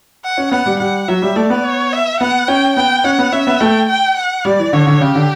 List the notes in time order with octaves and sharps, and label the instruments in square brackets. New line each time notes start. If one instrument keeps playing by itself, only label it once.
[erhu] F#5
[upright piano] C#4
[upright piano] B3 [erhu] F#5
[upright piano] G3
[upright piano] G3 [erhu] F#5
[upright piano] F#3 [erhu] E5
[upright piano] G3
[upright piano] A3 [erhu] D5
[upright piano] B3
[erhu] C#5
E5
[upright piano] B3 [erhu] F#5
[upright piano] C#4 [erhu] G5
[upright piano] B3 [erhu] G5
[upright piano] C#4 [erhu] F#5
[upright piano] B3
[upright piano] C#4 [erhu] E5
[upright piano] B3
[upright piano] A3 [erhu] G5
[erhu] G5
F#5
[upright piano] G3 [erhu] D5
[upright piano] E3
[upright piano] D3 [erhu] C#5
[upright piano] D3
[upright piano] C#3 [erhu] G4
[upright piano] D3